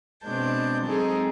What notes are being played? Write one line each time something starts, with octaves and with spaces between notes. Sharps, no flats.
B2 G#3 C4 D4 A5 G6
F#3 G#3 C4 D#4 G#4 A4